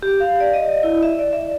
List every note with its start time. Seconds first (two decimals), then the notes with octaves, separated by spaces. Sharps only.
0.03 G4
0.20 F5
0.40 D5
0.53 D#5
0.83 E4
1.03 E5
1.19 D5
1.33 E5